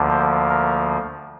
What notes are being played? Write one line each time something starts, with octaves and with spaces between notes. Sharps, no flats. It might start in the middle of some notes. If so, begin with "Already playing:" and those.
Already playing: D2 D3 F3 A#3
C5
A#4